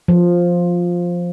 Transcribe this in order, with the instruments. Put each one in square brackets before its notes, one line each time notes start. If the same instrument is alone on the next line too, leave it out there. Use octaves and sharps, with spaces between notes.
[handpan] F3